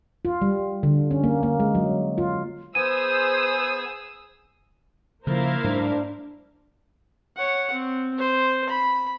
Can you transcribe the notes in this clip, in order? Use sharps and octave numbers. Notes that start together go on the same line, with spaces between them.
F4
G3
D3
C#4
A#3
A#3
G#3
F#3
F4
B3 G#4 C5 G#5 D#6 E6 D#7
C#3 F3 A#3 E4 A#4 C5 F5
G#2 F#3 D4
C#5 F#5
C4
C5
B5